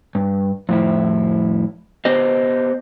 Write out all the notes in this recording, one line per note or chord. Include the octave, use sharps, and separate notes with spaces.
G2
F2 A2 E4
B3 G4 C5 D#5